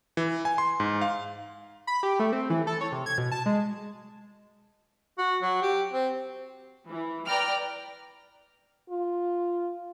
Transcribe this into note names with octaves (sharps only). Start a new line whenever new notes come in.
E3
G#5
C6
G#2
F5
B5
G4
A3
C4
E3
A4
C#5
C3
G#6
B2
A5
G#3
F#4
F#3
G4
C4
E3
B4 D5 G5 A#5 F6
F4